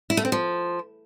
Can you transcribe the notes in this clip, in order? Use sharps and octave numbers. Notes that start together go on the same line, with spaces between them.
E4
A3
C4
F3